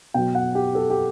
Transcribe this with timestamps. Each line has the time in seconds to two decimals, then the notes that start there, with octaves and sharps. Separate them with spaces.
0.14 B2 F#3 G5
0.35 F#5
0.55 G4
0.75 A4
0.90 G4